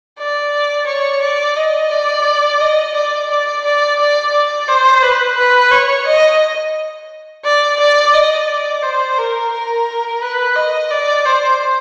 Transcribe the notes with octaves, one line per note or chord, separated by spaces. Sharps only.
D5
C#5
D5
D#5
D5
D#5
D5
D5
D5
D5
D5
C5
B4
B4
C#5
D#5
D5
D5
D#5
D5
C5
A#4
A#4
B4
D#5
D5
C5